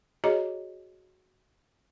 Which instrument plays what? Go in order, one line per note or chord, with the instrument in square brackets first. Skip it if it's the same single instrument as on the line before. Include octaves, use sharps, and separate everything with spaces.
[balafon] F#4 G#4 C#5 D#5 A#5